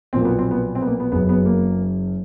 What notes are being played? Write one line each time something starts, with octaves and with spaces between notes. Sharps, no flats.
B1 A#2 F3 C4
A#3
B3
C4
B3
C4
B3
A#3
B3
F#1 F#2 C#3 B3
B3
A#3